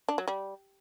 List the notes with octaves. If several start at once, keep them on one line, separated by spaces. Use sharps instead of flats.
D4
F#3
G3